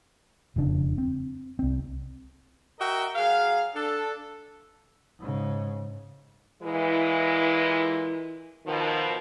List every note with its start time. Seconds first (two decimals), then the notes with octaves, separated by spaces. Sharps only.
0.56 E1 F2 C#3 D4
0.98 C4
1.59 C2 C4
2.79 F#4 A#4 D#5 E5 G5
3.15 F#3 G#4 F5
3.74 D4 A4
5.19 G#2 C#3
6.62 A#2 E3 G#3 E4
8.66 B2 D#3 F3